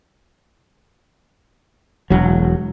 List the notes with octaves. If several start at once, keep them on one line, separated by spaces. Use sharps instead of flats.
E1 F#3